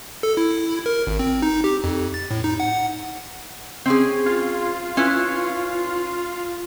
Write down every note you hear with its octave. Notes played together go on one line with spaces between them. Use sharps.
A4
E4
A#4
G#1
C4
D#4
G4
F2
A6
A2
D#4
F#5
C4 C#4 G#4
F4
C#4 E4 B4